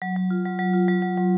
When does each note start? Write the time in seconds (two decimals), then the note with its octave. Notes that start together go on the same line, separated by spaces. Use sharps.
0.02 F#3
0.16 F#3
0.30 F4
0.45 F#3
0.59 F#3
0.74 F4
0.88 F#3
1.02 F#3
1.17 F#3